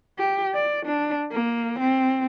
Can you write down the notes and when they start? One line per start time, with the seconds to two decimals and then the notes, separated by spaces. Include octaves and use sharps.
0.19 G4
0.55 D5
0.86 D4
1.32 A#3
1.79 C4